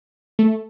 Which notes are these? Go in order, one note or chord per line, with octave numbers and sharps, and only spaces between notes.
A3